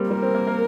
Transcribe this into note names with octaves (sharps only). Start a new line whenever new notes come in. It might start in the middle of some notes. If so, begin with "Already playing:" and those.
Already playing: G3 A#3 C4
G3 A#4
C4
A#3
A#3